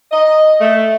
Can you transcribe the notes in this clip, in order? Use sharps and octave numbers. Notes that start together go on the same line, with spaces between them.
D#5
A3